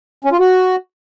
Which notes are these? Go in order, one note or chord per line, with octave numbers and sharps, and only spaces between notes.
C#4
F4
F#4